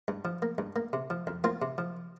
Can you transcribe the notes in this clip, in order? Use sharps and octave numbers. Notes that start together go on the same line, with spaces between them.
G2
F3
A#3
G2
A#3
C3
F3
F2
A#3 C4 F4
C3
F3